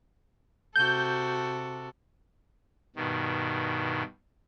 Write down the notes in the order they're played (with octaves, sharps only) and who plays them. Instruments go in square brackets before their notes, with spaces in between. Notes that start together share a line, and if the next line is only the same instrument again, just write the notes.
[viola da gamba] C3 F#4 A4 [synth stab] G6
[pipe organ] G2 B2 D#3